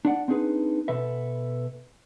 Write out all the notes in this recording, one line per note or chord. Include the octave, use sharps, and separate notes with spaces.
D4 D5 F#5
C4 D4 D#4 G#4 B4
B2 A4 B4 E5